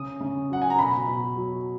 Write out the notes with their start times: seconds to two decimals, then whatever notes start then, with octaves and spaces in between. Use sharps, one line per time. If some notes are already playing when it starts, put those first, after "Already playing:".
Already playing: C#3 D#6
0.20 C#3
0.50 F#3 F#5
0.62 G#5
0.70 A#5
0.79 B2 B5
1.07 B2
1.36 F#3